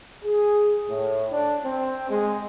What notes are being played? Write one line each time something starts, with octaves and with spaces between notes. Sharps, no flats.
G#4
A2
D4
C4
G#3